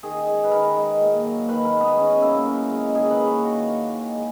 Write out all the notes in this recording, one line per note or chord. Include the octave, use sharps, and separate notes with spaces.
D#3 G#4
G#3
B4
D#3 A#4
G#3
A#2
F#3 A#3
D#3 B4
A#4
G#3
B3
D#3 C#4
F#3 A#3 E4
C#3 A#4
G#3
D#3 G#4
B4
A#3
C#5
D#3 F#4
A#3
D#3
G#3